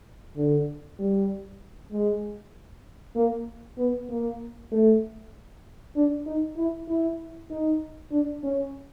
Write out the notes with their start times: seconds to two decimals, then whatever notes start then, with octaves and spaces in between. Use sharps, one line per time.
0.37 D3
0.99 G3
1.92 G#3
3.15 A#3
3.77 B3
4.09 A#3
4.72 A3
5.96 D4
6.26 D#4
6.57 E4
6.88 E4
7.50 D#4
8.11 D4
8.43 C#4